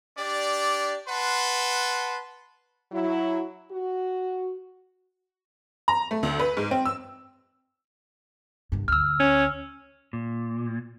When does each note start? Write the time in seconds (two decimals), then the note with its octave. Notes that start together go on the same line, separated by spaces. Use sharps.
0.18 D4 G4 D5
1.08 B4 F#5 A5 C6
2.92 F#3 E4
3.71 F#4
5.88 A#5
6.11 A3
6.23 D2
6.39 B4
6.57 G#2
6.71 C4
6.85 E6
8.72 C2 G2
8.88 D2 E6 F6
9.20 C#4
10.13 A#2